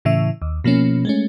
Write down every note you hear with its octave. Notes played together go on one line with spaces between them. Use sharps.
A2 C#3 E3 E5
D#2
B2 F3 A#3 C#4
G#3 A3 C#4